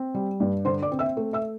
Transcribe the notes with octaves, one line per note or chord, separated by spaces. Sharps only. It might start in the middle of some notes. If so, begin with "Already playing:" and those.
Already playing: C4
G3
G2
D3 C5 C6
D5 D6
C4
E5 E6
A3
E5 E6